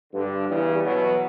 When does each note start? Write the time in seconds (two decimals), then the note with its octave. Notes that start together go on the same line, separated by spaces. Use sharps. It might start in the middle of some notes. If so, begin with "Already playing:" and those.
0.13 G2 D3 G3
0.48 E2 C#3 G3
0.82 E2 B2 F#3 B3